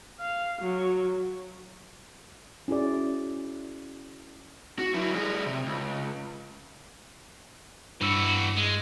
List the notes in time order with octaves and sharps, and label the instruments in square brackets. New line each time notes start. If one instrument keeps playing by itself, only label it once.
[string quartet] F5
F#3
[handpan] C#4 E4 F#4 G#4 D5
[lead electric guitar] F#4
F#3 E4
G3 G#4
C3
C#2
[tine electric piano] G2 E6 C#7 [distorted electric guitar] E3 F#4
[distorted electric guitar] G#3